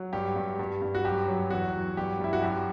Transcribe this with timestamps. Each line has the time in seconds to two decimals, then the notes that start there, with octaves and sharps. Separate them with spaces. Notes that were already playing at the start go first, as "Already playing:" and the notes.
Already playing: F#3
0.13 G2 G4
0.36 G2
0.59 G2
0.82 G2
0.95 F#4
1.04 F#2 G4
1.28 F#3
1.50 E2 F#4
1.73 F#3
1.97 G2 G4
2.20 G2 E4
2.33 F#4
2.42 F#2 G4